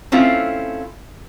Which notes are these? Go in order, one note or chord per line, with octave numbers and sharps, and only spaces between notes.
A3 C4 C#4 E4 F4